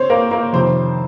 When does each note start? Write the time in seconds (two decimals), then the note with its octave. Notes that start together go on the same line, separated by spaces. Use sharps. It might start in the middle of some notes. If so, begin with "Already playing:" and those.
Already playing: C4 C5 C#5
0.10 A#3 A#4
0.31 A#3 A#4
0.53 F2 C3 D#3 C4 C5